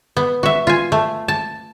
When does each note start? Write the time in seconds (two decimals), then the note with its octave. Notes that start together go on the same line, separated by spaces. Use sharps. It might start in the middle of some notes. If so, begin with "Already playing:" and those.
0.17 B3
0.43 F#4 E5
0.67 F4 G#5
0.92 A3
1.28 A5